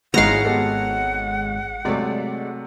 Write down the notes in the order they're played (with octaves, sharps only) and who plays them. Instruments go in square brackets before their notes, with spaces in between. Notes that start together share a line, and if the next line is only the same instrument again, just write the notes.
[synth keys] G#1 G#3 C#5 [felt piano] D#4 E4 [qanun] F5 A#5 [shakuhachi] F#5
[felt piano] B3 G4 A4
[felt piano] C3 F#3 A3 [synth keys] G#3 D5